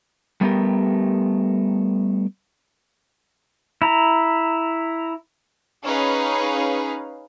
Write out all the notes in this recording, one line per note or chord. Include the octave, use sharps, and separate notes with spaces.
G3 A3 B3 G4 A#4
E4 A#5
C#4 D#4 G#4 B4 F5